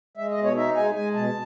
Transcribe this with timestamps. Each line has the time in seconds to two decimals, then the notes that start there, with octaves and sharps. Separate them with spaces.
0.17 G#3 E5
0.31 D#5
0.37 B2
0.44 C#5
0.56 D#4 E5
0.76 G#3 G#5
0.95 G#3 G#5
1.14 B2 A5